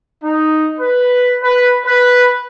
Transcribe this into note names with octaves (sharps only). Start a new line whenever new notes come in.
D#4
B4
B4
B4